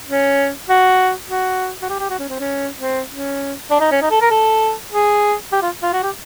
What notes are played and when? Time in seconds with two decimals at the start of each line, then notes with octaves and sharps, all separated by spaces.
0.08 C#4
0.69 F#4
1.28 F#4
1.82 F#4
1.89 G4
2.00 G4
2.10 F#4
2.19 C#4
2.29 C4
2.39 C#4
2.80 C4
3.11 C#4
3.70 D4
3.80 D#4
3.91 C#4
4.01 D#4
4.10 A4
4.21 A#4
4.31 A4
4.92 G#4
5.52 G4
5.62 F4
5.82 F4
5.93 F#4
6.03 G4